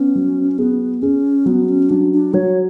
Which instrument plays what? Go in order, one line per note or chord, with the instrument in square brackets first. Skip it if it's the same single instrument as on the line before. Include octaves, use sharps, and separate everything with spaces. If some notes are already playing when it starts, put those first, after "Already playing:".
Already playing: [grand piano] B3 [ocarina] C#4
[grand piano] F#3
[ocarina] B3 [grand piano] G#4
[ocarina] C#4 [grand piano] G#4
[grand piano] F#3 [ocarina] B3
[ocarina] C#4
[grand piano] F#3 [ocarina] D4
[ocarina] D4
[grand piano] F#3 [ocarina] C#5